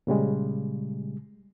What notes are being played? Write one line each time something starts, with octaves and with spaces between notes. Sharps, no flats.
A#2 C#3 G3 G#3